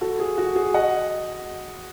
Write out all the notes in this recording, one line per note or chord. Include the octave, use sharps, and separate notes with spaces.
F#4 A4
G#4
F#4
G#4
D#5 F#5